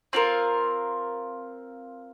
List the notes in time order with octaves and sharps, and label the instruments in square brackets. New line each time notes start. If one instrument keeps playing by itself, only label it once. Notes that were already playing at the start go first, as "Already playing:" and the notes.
[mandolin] C4 F4 A#4 F5